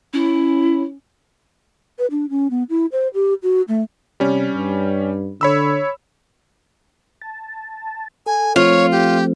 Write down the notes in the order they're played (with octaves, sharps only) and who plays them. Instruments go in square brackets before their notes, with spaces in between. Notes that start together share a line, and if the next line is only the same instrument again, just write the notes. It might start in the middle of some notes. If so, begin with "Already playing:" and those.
[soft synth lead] C#4 [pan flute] E4
[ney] B4
D4
C#4
B3
E4
C5
G4
F#4
A3
[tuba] C3 [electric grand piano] G3 C#4
[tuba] G2
[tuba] D3 [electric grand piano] C#5 B5 E6
[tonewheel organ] A5
[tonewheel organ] A4 [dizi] G#5
[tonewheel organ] F3 A3 C4 [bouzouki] F4 [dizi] C#5
[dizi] G4